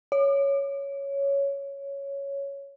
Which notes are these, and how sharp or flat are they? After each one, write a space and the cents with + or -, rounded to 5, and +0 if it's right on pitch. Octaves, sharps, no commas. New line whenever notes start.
C#5 +5